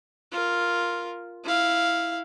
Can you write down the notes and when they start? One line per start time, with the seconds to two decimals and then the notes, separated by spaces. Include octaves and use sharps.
0.32 F4 A#4
1.44 E4 F5